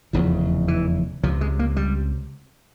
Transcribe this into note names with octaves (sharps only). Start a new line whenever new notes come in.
F1 E2 C#3 F3
E3
C#2 C3 F3
G#3
A#3
G3